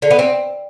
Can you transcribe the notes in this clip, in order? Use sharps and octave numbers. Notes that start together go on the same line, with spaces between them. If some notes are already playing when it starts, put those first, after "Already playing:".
D3
B3
C4